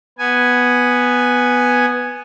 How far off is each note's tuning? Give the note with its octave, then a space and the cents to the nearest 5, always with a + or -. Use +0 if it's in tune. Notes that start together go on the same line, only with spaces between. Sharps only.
B3 +0 G#5 +0